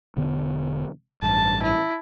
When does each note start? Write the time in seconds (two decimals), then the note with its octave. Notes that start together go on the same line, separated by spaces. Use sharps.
0.17 E1 D3 B3
1.22 A1 G2 A5
1.63 E4